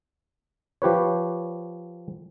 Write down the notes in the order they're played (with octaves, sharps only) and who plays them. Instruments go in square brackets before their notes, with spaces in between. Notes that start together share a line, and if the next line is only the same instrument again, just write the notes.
[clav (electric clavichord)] F3 G4 B4 C#5